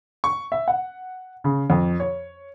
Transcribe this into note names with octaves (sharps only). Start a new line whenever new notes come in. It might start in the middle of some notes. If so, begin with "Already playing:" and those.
C#6
E5
F#5
C#3
F2
C#5